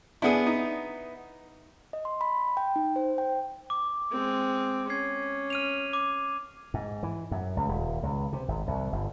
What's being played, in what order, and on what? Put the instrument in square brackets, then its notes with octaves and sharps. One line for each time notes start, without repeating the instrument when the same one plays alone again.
[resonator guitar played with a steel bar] B3 E4 [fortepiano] D4 G#4
[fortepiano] D#4
[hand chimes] D#5
C6
B5
G5
D#4
C5
G5
[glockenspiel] D6
[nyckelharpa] G#3 C4
[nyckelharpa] C#4 [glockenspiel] G#6 C7
[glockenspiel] F6 D#7 F7
D6
[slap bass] G#2
E3
F#2
C#2
D#1
C#2
C3
G#1
C2
G1